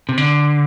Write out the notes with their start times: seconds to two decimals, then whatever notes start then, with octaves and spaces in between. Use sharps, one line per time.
0.09 C3
0.18 D3